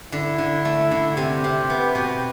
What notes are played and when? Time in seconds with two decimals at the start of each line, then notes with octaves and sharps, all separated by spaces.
0.12 D3 E4
0.38 D3
0.65 A3
0.91 D3
1.17 C3 G4
1.44 C3
1.70 B3
1.95 B2